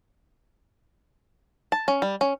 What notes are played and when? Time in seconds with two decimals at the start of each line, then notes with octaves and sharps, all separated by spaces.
1.72 A5
1.88 C#4
2.02 G3
2.21 C#4